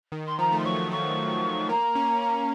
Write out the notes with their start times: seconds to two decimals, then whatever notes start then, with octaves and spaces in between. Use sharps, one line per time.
0.12 D#3
0.26 C6
0.38 F3 A#5
0.52 A3
0.58 C6
0.65 F#3 C#6
0.91 A3 C#6
1.29 A3
1.69 A#3 A#5
1.95 C#4
2.22 A#3